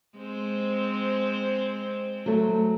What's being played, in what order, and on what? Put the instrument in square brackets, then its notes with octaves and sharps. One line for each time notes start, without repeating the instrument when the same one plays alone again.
[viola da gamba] G#3 C4 C5
[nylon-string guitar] F#3 A3